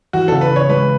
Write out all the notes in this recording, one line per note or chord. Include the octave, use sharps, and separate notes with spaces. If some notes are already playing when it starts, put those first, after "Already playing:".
E3 F#4
C#3 A4
B4
C#3
C#5
G#3 B4